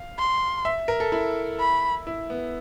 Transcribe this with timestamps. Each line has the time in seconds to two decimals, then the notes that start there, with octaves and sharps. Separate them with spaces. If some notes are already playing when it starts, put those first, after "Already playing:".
Already playing: F5
0.19 C6
0.65 E5
0.88 A#4
1.00 A4
1.12 E4
1.60 B5
2.07 E4
2.30 B3